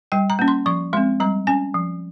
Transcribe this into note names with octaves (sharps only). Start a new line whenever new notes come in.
G3 G5
A#5
A#3 C#4
C6
F3 C#6
G#3 C4 C6
G3 A#5
C#4 G#5
F3